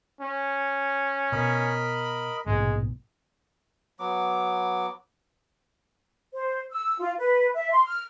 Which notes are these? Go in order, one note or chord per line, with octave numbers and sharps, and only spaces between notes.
C#4
B2 A#4 D#5 B5
A#1 G#2 B2 G#3
F#3 B3 D6
C5
E6
F4
B4
E5
C6
F6